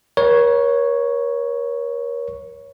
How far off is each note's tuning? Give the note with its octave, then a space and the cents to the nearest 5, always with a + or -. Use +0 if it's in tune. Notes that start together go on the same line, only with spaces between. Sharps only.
A#4 +40 C#5 +0